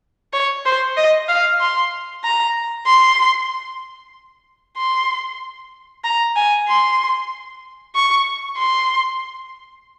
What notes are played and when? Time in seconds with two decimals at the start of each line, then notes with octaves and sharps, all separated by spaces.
0.33 C#5
0.66 C5
0.97 D#5
1.29 F5
1.61 C6
2.24 A#5
2.87 C6
4.78 C6
6.04 A#5
6.36 G#5
6.68 C6
7.95 C#6
8.59 C6